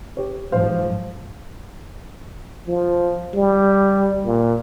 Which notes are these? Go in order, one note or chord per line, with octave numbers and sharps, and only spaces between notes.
G4 C#5
G#2 F3 C5 F5
F3
G3
A#2